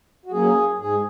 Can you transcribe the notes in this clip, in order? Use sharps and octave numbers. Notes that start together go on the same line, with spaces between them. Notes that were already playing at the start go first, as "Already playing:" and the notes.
F#4
F#3 A#3 C#4 G#4
G#2 G#4